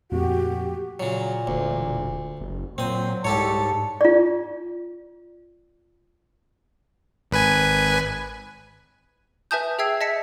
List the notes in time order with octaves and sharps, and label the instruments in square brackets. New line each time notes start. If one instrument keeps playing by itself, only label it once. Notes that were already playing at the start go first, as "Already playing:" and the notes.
[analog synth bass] F2 [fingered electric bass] A#2 A3 A#3 [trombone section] F#4 [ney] G4
[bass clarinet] A#2 [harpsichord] C#3 F#3
[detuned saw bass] E1 [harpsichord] D2
[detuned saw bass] F#1
[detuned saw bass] A#2 [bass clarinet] F#3 [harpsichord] C4 D#6 [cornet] C5
[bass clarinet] C2 [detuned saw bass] G#2 [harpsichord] G4 A4 C#5 [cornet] A5
[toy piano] F4 D5
[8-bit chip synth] G#1 B4 G#5
[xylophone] B4 E5 G#5 A5 D#6 G6
G#4 E5 G5 E6 G#6 C7
D#5 E5 A5 B6 C#7